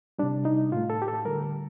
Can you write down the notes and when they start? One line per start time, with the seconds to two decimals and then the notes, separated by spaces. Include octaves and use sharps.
0.19 C3 G3 D4
0.45 D#4
0.72 A2 A3 F4
0.90 A4
1.02 G4
1.08 A4
1.25 D3 G3 A#4